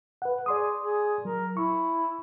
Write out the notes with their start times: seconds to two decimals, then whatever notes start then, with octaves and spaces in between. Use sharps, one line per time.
0.22 B4 F#5
0.46 G#4 D5 C6 D#6
0.82 G#4
1.25 F#3 A#4
1.57 E4 C#6